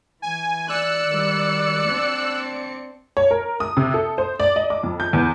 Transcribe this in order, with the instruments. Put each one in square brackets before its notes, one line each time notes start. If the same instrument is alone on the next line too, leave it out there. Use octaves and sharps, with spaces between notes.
[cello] E3 [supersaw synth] G#5
[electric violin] D5 C#7 [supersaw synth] E6 F#6
[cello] D#3 G3
C4 D4
[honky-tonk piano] C#5
A#4
D#6
C3
A4
C5
D5
D#5
D6
F2
G6
E2